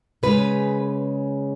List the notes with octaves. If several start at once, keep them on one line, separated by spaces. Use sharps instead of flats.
C#3 G#3 C#4 B4